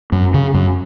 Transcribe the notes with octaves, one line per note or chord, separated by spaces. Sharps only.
F#2
C#3
F#2